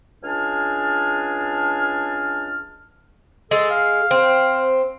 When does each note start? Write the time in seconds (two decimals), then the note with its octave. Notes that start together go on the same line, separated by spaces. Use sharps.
0.23 C#2 D4 G#4 G#5 A5 F6
3.51 G#3 A4
3.70 F5
4.11 C4